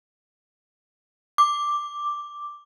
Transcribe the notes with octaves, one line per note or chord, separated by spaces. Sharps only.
D6